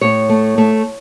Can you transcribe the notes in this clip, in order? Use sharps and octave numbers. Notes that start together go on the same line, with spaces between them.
A2 C#5
A3
A3